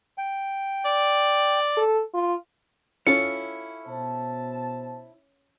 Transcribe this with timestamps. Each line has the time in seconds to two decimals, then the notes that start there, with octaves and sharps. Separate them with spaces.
0.18 G5
0.85 D5
1.77 A4
2.14 F4
3.07 C#4 E4 F4 A4 C#7
3.87 B2 C5 A5